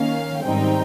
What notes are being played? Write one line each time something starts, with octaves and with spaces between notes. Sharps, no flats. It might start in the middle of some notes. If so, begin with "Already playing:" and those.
Already playing: D#3 A#3 C#4 F5
G#2 D#3 G3 C4 D#4 G5